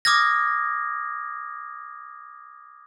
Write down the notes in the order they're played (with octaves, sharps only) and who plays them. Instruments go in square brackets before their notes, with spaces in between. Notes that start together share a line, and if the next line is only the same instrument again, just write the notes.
[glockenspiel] D6 D#6 F6 G#6 A#6